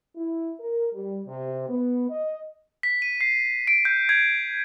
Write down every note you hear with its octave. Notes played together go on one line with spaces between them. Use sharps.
E4
A#4
G3
C3
B3
D#5
B6
D#7
C7
D7
G6
G#6